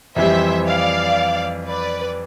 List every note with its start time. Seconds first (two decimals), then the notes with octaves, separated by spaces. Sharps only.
0.16 F2 E3 G3 C5 E5
0.67 D5 F5
1.68 B4 D5